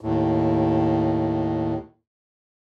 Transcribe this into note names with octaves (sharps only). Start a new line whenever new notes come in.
D#2 A2